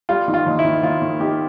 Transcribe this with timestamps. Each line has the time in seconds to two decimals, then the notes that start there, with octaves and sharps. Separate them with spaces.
0.09 G3 F4
0.28 D#3
0.34 F4
0.46 D#2
0.59 E4
0.65 D#3
0.83 D#2 F4
1.02 D#3
1.20 D#3 G4